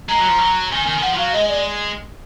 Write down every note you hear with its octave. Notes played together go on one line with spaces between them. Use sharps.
G#3 A#5
F#3
F3
F#3
D#3 G#5
D#3 G#5
D#3
F3 F#5
F3
F#3 F5
G#3 D#5
D5